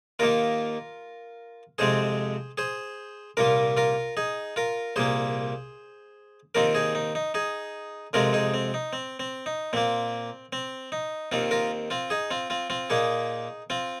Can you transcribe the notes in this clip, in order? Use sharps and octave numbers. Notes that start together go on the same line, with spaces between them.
D#2 D#3 A#3 F4 A#4
F2 C3 G#3 C4 G#4 C5
G#4 C5
C2 A#2 A#3 F4 A#4
F4 A#4
D#4 G#4
F4 A#4
C2 A#2 A#3 G#4 C5
D#2 D#3 C4 F4 A#4
D#4 G#4
D#4
D#4
D#4 G#4
F2 C3 G#3 C4 F4 A#4
D#4 G#4
C4
D#4
C4
C4
D#4
A#2 A#3 C4
C4
D#4
D#2 D#3 C4 F4
F4 A#4
C4 F4
D#4 G#4
C4 F4
C4 F4
C4 F4
A#2 A#3 D#4 G#4
C4 F4